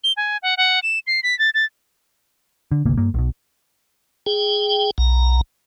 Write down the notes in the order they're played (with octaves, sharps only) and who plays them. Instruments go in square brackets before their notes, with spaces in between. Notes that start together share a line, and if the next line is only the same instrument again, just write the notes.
[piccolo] G7
G#5
F#5
F#5
E7
C7
B6
A6
A6
[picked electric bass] D3
G1 D2 C3 A#3
G2 A#3
B1 B2
[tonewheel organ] G#4 G5
B1 A#5